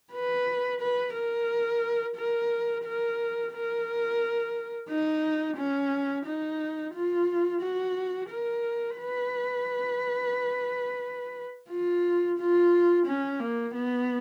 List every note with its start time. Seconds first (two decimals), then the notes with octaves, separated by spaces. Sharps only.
0.12 B4
0.80 B4
1.14 A#4
2.16 A#4
2.84 A#4
3.52 A#4
4.89 D#4
5.56 C#4
6.25 D#4
6.93 F4
7.61 F#4
8.29 A#4
8.97 B4
11.70 F4
12.38 F4
13.06 C#4
13.40 A#3
13.74 B3